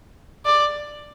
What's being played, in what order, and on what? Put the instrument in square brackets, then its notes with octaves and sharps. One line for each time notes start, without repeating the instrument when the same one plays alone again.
[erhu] D5